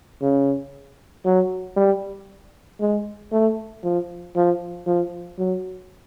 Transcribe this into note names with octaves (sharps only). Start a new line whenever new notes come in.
C#3
F#3
G3
G#3
A3
F3
F3
F3
F#3